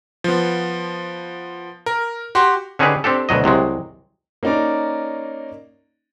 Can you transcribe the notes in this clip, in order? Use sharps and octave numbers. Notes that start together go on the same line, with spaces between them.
F3 B3
A#4
F#4 G4 C6
D3 C#4 D#4 G4 G#4 B4
C4 D4 G4 A4
D2 B2 F#3 D#5
C2 C3 F#3 G#3
A#3 C#4 D#4 D5 A#5